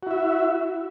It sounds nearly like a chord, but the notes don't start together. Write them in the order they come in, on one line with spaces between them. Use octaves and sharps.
F#4 E4 E5